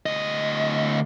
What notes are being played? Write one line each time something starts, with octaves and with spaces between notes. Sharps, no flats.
D2 D#5